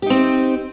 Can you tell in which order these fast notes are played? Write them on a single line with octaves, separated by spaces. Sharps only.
G4 D#4 C4